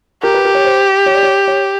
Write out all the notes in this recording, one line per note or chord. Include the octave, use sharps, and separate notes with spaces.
G4 A#4
B4
A#4
C#5
C5
C#5
D5
C#5
C#5